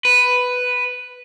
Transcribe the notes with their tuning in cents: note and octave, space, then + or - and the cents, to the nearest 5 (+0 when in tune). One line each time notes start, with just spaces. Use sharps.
B4 +5